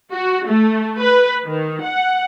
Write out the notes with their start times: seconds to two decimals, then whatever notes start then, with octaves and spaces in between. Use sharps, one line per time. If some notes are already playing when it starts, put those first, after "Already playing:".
0.14 F#4
0.48 A3
1.00 B4
1.45 D#3
1.85 F#5